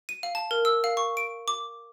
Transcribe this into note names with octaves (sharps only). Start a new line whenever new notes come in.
D#7
F5
A5
A#4
E6
F5
C#6
D7
D6